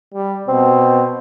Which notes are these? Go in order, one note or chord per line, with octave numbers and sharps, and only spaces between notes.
G3
B2 C4